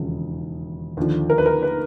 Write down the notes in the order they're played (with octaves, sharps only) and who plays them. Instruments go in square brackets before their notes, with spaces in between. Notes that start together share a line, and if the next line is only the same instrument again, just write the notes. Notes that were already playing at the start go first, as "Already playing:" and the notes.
Already playing: [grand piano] E1 D#2 C#3 F3
D#2 D3 F3
A#4
B4
A#4
B4